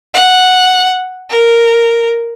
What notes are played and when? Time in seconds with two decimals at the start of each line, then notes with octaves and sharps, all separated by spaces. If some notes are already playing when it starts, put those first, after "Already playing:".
0.14 F#5
1.30 A#4